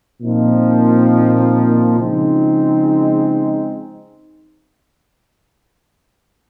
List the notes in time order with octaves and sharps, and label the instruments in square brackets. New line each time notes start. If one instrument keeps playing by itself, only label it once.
[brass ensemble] A#2 F3 C4 D#4
C#3 F3 G#3 C4 D#4